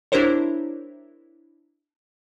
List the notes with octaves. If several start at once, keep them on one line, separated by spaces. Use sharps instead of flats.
D4 E4 G4 A#4 C5 C#5